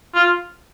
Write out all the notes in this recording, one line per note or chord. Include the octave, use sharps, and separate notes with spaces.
F4